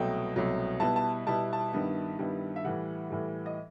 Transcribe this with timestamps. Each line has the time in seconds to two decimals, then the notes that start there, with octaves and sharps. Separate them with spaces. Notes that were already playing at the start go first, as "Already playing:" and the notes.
Already playing: C2 B2 F#3 A3 G5
0.35 C2 B2 F#3 A3
0.80 B2 G3 B3 E4 A5
0.96 A5
1.26 B2 G3 B3 E4 A5
1.53 A5
1.73 G2 D#3 G3 B3 E4
2.19 G2 D#3 G3 B3 E4
2.56 E5
2.64 A2 E3 G3 F#5
3.10 A2 E3 G3
3.46 D#5